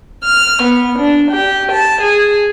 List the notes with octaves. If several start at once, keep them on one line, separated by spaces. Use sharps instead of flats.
F6
B3
D4
G4
A5
G#4